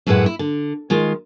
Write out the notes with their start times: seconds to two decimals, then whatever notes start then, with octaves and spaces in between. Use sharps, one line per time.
0.07 F#2 A2 G#3 E4 B4 F#5
0.26 E4
0.39 D3
0.90 D#3 G#3 F4